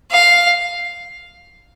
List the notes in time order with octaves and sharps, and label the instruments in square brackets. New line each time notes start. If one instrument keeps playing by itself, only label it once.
[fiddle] F5